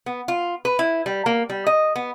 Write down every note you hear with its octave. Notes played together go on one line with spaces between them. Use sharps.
B3
F4
B4
E4
G3
A#3
G3
D#5
B3